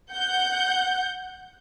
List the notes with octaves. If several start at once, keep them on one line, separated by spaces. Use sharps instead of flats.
F#5 G6